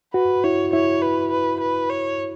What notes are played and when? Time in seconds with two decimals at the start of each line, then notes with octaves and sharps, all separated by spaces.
0.14 F#4 B4
0.44 E4 C#5
0.73 E4 C#5
1.02 B4
1.32 B4
1.60 B4
1.90 C#5